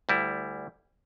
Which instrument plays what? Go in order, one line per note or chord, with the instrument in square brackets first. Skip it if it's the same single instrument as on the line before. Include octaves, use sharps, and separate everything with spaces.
[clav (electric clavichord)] D2 G3 E4